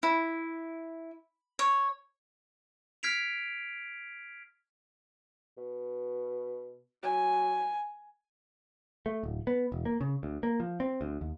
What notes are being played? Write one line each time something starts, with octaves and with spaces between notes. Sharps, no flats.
E4
C#5
F6 G#6 B6 C7 D7 F7
B2
F#3 G#5
A3
D1
B3
E1
A#3
C#3
D2
A#3
F3
C4
D2
D#2